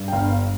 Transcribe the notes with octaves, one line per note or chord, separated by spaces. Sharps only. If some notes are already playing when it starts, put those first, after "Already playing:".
Already playing: G2
G5
G1 F5